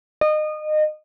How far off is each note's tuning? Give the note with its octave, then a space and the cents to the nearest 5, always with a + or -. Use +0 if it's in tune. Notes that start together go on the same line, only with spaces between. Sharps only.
D#5 -25